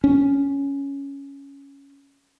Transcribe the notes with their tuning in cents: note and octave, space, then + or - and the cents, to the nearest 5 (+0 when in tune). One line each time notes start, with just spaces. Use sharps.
C#4 +5